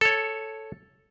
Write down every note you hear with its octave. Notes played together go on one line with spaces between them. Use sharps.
A4 C#5